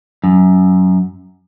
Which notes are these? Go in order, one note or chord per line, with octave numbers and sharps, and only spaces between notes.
F#2